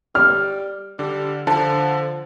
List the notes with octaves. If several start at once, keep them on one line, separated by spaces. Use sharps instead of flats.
G3 F6
D3 G3
D3 F3 A5